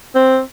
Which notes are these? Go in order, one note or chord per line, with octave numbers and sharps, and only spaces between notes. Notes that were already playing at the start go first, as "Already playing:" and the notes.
C4